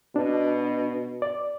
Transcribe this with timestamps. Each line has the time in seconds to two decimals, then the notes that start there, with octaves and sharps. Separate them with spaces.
0.16 B2 D4
1.22 D5